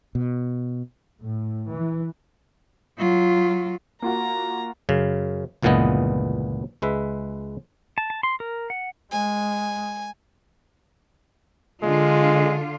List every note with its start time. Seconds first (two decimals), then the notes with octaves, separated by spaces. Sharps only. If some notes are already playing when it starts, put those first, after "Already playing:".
0.15 B2
1.23 A2
1.71 E3
2.99 F#3 F4
4.02 A#3 F4 F#4 A#5
4.89 F#2 C#3
5.62 G1 C#2 A#2 E3 B3 D#5
6.82 C#2 G#3 B4 E5
7.98 A5
8.10 A5
8.23 C6
8.40 A#4
8.70 F#5
9.12 G#3 G#5
11.83 D3 G#3 F4